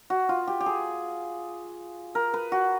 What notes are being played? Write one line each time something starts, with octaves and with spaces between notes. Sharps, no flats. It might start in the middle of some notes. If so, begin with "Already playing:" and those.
F#4
F4
G4
G4
G#4
A#4
B4
F#4